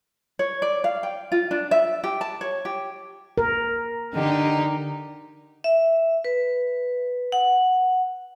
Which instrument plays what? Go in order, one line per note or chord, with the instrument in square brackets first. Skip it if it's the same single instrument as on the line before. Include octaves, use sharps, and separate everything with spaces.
[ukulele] C#5
D5
F5
G5
F4
D4
E5
G4
A5
C#5
G4
[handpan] A#4
[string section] D3 D#4 G4
[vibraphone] E5
B4
F#5